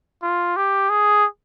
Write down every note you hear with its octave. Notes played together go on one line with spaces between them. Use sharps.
F4
G4
G#4